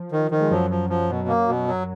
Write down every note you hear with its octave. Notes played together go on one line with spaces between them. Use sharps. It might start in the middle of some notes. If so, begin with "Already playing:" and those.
Already playing: F3
D#3
D#3
G#3
F#2 F3 F#3
F3
F3
B2
A#3
B2
F#3